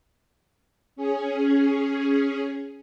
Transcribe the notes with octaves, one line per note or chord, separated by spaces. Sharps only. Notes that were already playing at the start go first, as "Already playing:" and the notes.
C#4 G#4